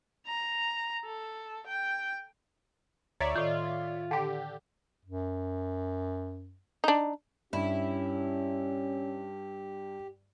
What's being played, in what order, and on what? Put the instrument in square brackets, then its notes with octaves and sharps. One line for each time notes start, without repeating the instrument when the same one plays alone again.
[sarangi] A#5
A4
G5
[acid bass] D2 [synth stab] C#5 D5 E5 [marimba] A#5
[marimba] A2 D#3 [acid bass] F4
[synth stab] D3 G4
[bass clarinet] F#2
[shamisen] D4 D#4
[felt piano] G2 [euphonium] C#4 [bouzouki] E4 [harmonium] G4